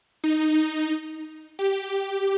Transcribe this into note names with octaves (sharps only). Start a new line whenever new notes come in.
D#4
G4